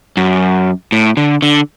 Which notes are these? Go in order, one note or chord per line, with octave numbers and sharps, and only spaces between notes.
F#2
A2
D3
D3